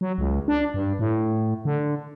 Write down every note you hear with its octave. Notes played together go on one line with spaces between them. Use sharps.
F#3
C#2
D4
G2
A2
D3